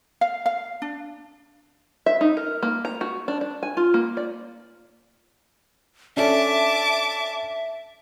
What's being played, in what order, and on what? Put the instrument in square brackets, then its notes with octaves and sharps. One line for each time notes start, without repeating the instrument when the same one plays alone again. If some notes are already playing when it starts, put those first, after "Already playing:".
[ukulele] F5
F5
D4
[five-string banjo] E5
D#4
A#4
A#3
A#5
F#4
D4
D4
G#5
F4
A#3
D5
[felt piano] C#4 D4 A4 [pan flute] E5 [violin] A5 D6